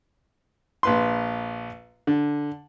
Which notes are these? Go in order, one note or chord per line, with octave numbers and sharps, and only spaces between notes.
A#1 B4 C6
D3